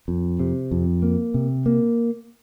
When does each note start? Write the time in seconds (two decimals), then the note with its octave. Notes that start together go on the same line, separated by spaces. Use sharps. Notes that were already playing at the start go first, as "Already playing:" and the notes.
0.08 F2
0.40 C3
0.71 F2
1.03 A#3
1.34 C3
1.66 A#3